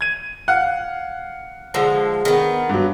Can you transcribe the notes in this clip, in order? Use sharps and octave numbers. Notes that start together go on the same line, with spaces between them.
G#6 D#7
F5 F#5 F#6
D3 F3 G#3
D#3 B3
G2 F#3